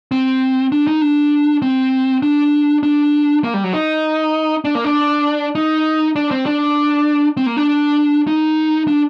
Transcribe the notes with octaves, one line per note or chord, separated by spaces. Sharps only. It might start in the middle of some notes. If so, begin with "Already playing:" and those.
C4
D4
D#4
D4
C4
D4
D4
A#3
G3
F#3
D#4
D4
A#3
D4
D#4
D4
C4
D4
C4
A#3
D4
D#4
D4